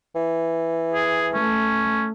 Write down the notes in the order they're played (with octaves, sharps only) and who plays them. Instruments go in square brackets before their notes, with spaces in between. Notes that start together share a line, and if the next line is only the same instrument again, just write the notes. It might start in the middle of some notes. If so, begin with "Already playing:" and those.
[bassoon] E3
[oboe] G#4
[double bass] A3 [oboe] C#4